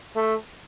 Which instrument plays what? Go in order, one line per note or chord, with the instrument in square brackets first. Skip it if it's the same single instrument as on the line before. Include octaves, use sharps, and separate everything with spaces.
[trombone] A3